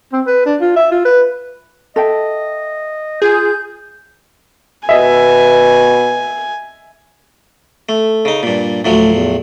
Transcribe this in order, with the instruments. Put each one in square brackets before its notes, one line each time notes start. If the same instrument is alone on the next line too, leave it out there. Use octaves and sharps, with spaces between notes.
[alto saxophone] C4
B4
D4
F4
E5
F4
B4
[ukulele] A4 E5 G5 [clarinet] D#5
[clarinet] F4 [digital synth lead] G#4 [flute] G6
[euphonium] B2 [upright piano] D#5 E5 [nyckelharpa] G#5
[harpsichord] A3
C#3 D#4
G2 A#2
[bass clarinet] D2 [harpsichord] A2 F3 F#3
[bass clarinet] E2